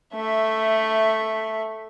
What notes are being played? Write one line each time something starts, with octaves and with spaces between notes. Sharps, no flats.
A3 E5